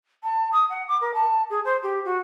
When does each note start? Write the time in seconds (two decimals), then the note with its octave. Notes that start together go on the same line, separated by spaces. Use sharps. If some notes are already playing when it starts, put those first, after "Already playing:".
0.23 A5
0.52 D#6
0.70 F#5
0.88 D6
1.01 A#4
1.14 A5
1.50 G#4
1.65 C5
1.83 G4
2.05 F#4